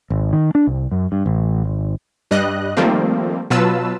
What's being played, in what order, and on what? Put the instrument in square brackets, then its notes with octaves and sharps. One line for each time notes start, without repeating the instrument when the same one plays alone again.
[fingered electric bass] G#1
D#3
D4
C2
F#2
G2
A1
G#1
[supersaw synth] G2 G3 D#5 F#6
D#3 F3 G3 A3 A#3 C4
B2 F#3 F4 B4 A5 E6